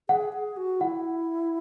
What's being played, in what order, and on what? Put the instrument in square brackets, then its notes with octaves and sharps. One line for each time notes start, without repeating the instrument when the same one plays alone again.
[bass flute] G#4 [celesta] F#5
[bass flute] G#4
F#4
[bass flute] E4 [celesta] F#5